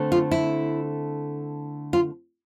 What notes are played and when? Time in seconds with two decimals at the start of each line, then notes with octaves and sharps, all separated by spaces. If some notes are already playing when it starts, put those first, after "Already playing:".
Already playing: D3 A3 C4
0.12 F4
0.31 E4
1.93 F4